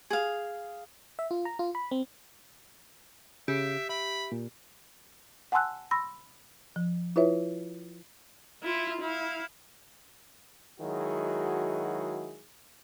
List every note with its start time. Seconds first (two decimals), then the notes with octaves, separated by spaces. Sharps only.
0.10 G#4 F5
1.19 E5
1.31 F4
1.45 A#5
1.59 F4
1.75 B5
1.91 C4
3.48 C#3 G4 E5
3.89 E5 B5
4.32 A#2
5.52 F#5 G#5 A5 C6 E6 F#6
5.91 B5 C6 E6 A#6
6.76 F3
7.16 E4 F4 B4 C#5 E5
8.63 E4 F4
9.01 E4 F5
10.80 D#3 F#3 G#3 E4 F#4 G#4